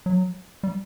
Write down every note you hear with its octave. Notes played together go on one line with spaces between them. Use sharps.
F#3
G3